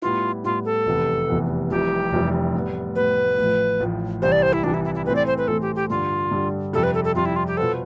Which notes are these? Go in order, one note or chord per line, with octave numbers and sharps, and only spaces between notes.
A2 G3 B3 E4 F4
A2 G3 B3 E4 F4
A4
F1 E2 C3 E3 B3
F1 E2 C3 E3 B3
F1 F2 C3 E3 G3 G4
F1 F2 C3 E3 G3
A2 G3 B3
A2 G3 B3 B4
A1 A2 F3
A1 A2 F3
C2 C3 E3 G3 C5
D5
C5
E4
C2 C3 E3 G3 D4
E4
E4
E4
A2 E3 A3 C4 B4
D5
C5
B4
A2 E3 A3 C4 A4
G4
G4
G2 D3 G3 F4
G2 D3 G3
F2 C3 G3 A4
B4
A4
A4
F2 C3 G3 F4
E4
F4
G4
B2 B3 F4 A4 C5